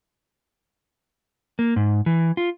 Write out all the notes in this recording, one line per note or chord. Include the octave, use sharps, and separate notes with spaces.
A#3
G#2
E3
F4